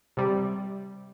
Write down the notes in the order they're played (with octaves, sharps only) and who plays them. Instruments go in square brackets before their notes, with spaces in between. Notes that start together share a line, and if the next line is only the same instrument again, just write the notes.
[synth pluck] C3 G3